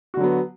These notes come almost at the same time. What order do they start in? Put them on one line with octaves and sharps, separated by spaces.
F#4 D3 F#3 B3